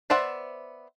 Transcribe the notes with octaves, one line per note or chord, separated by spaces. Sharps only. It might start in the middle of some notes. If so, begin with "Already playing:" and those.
B3 C5 D5 E5 F#5